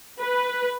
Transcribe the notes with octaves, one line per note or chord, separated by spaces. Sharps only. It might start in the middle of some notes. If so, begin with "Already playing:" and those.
B4